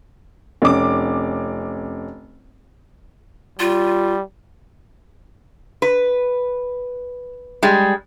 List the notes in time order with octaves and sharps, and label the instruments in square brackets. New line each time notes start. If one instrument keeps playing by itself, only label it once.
[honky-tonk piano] F1 C#4 D6
[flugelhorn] G3 [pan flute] F4
[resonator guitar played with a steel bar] B4
G3 G#3